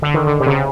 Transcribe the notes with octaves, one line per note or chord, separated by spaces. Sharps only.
D3
D#3
D3
C3
C#3